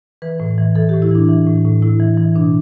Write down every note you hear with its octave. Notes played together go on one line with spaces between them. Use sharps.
E3 B4
A2
E3
E3 A4
A2 G4
E4
E3 D4
E3
A2
A2
A2 E4
E3
E3
B2 D4